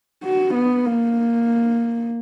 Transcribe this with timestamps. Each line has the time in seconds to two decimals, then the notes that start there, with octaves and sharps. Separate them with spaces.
0.24 F#4
0.54 B3
0.85 A#3